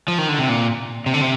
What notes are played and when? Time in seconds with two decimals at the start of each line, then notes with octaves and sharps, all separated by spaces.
0.08 F3
0.18 D#3
0.28 D3
0.39 C3
0.49 A#2
1.06 C3
1.14 D3
1.21 C3